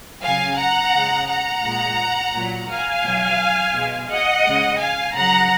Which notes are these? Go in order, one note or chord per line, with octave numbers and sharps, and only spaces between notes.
C#3 F#3 F5 G#5
F#5 A#5
C#3 G#3
F#5 A#5
A#2 G#3
A#2 F#3
F5 G#5
B2 F#3
B2 G#3
D#5 F#5
C#3 G#3
F5 G#5
C#3 F#3 F#5 A#5